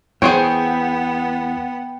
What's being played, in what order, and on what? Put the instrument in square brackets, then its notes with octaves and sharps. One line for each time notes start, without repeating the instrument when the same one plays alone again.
[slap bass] E2 [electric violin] B3 F#5 [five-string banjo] G#4 C5 C#5 [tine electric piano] G5